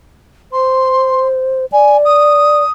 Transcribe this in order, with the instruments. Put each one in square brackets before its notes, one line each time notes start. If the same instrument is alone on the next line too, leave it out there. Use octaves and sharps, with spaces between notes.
[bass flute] C5 [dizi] C6
[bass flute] D5 [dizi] G#5
[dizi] D#6